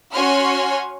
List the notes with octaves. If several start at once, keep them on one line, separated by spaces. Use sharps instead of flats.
C#4 F#4 C#5 G#5 C6 F6